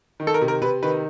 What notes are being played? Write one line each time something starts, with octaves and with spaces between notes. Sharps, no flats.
D#3
A4
A#4
C3
A#4
C3 B4
D#3 B4